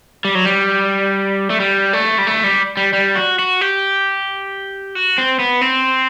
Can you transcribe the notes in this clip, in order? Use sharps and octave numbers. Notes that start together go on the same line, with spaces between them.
G3
F#3
G3
A3
G3
A3
G3
A3
G3
G3
G3
F#4
F#4
G4
F#4
C4
B3
C4